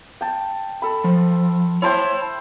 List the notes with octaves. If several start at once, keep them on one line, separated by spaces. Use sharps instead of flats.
G5 A5
A4 B5
F3
E4 C5 C#5 G5 A5